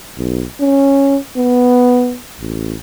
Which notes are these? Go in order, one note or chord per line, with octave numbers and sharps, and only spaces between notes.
B1
C#4
B3
A1